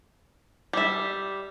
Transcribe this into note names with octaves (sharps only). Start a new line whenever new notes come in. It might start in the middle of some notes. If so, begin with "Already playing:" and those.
G3 E5